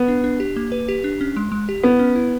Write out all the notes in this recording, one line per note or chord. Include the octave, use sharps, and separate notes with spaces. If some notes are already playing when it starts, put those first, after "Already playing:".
Already playing: B3
D4
D4
G4
A#3
B4
G4
D4
C#4
G#3
G#3
G4
B3 E4
C#4
E4